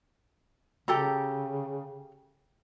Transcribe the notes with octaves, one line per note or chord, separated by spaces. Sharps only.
C#3 G4 A4 A#5